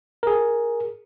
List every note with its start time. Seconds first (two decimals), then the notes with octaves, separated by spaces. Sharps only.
0.23 G#4 A#4